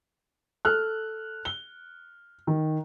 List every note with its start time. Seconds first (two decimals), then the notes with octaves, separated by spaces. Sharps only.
0.65 A4 F6 F#6
1.45 G7
2.47 D#3